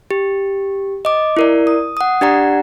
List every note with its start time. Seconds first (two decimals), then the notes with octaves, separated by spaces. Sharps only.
0.11 G4
1.05 D#5 D6
1.37 E4 A#4 D5
1.67 D#6
1.97 F#5 D#6
2.21 D4 G4 D5 F#5 A#5